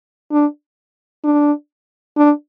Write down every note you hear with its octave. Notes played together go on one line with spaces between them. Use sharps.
D4
D4
D4